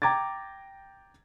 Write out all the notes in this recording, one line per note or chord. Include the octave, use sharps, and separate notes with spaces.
G5 A#5 D6 G#6 A6